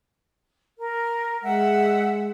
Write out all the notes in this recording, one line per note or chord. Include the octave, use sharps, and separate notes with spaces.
A#4
G#3 E5 F#5